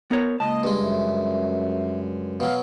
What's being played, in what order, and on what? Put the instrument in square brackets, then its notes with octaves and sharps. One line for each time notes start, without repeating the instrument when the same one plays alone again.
[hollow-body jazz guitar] B3 A#4 C#5
[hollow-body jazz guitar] C#2 A5 [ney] A#3 [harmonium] D#5
[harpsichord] G2 G#3
[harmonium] F#2 [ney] E5
[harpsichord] B2 F#3 [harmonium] F5